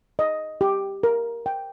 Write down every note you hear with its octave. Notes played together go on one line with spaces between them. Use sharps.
D#5
G4
A#4
G5